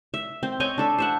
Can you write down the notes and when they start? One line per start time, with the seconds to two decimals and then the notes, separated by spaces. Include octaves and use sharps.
0.14 E5
0.43 C4
0.60 C#5 D#5 G5 G#5
0.78 D4 A4 E5
0.98 C5 E5 F#5